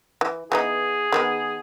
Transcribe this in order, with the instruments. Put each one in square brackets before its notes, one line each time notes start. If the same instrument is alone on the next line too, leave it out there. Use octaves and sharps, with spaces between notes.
[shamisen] E3
[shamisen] E3 B3 D#4 [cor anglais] G#4
[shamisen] D#3 G#3 B3